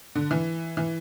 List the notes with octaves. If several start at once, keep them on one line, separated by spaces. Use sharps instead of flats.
D3
E3
E3